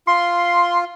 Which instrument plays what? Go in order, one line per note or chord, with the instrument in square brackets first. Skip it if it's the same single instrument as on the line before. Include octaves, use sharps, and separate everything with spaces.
[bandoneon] F4 [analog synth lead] C6